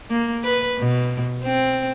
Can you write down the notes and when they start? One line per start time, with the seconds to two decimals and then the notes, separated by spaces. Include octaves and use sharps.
0.10 A#3
0.44 B4
0.79 B2
1.44 C4